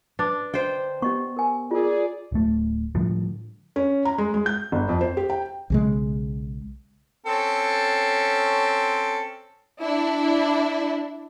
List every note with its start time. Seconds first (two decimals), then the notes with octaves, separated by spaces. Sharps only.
0.19 D4 B4 D6
0.54 D3 C5 D#5 G5
1.02 B3 G4 D#5 C#6
1.37 A#4 G#5
1.71 F4 G#4 A#4 D5
2.32 D1 A3
2.95 A2 D3 F3 G3
3.76 C#4
4.05 A#5
4.18 G#3
4.34 G#3
4.46 G6
4.72 G1
4.89 F2
5.01 C5
5.17 G4
5.30 G5
5.70 B1 C#3 G#3
7.26 C4 C#4 A4
9.81 D4 E4